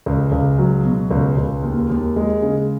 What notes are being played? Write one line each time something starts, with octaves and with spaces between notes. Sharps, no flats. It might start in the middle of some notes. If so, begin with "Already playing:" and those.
C#2
C#2
F#3
B2
C#2
C#2
D#2
D#2
G#3
C#3